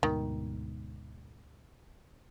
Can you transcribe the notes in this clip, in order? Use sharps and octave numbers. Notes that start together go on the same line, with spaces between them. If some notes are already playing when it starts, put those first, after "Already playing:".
D2 G#2 B2 D#3